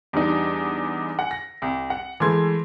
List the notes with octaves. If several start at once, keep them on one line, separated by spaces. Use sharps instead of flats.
E2 G3 D4 D#4
F#5 G#5
A#6
C2
F#5
E3 G#3 A3 C6 G#6